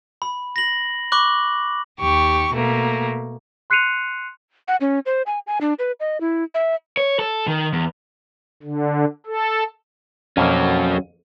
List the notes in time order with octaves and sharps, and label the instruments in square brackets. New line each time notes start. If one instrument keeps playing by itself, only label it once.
[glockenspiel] B5
A#6 F#7
B5 C#6 D6 F#6 F#7
[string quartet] D#2 G4 C#6
B2 A3 A#3
[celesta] C6 F#6 C7 C#7 D#7 F7
[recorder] F#5
C#4
C5
G#5
G#5
D4
B4
D#5
E4
E5
[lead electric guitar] C#5
A4
D#3
E2
[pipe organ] D3
A4
[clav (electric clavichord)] F2 B2 A#3 [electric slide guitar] F#3 C#4